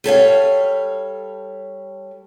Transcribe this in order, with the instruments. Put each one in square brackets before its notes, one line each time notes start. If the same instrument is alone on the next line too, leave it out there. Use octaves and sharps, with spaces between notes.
[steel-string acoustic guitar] G3 A4 C#5 F5